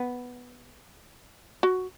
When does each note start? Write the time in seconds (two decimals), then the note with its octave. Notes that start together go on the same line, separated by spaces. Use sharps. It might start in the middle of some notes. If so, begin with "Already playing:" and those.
Already playing: B3
1.63 F#4